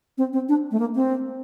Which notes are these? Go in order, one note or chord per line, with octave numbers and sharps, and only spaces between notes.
C4
C4
D4
A3
A#3
C4